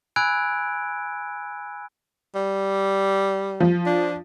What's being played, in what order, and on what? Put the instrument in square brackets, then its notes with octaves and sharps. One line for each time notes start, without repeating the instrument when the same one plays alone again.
[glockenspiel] G#5 B5 E6 F#6 G#6 D7
[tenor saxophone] G3
[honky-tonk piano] F3
[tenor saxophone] D4